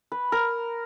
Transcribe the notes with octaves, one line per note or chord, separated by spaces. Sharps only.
B4
A#4